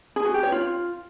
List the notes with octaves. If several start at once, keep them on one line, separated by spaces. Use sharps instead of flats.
G#4
F#4
G4
C#5
F4